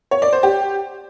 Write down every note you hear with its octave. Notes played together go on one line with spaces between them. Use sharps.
C#5
D5
C5
G4